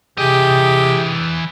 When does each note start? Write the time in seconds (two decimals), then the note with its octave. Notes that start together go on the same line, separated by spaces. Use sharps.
0.18 C3 E3 G4 G#4 D#5 G5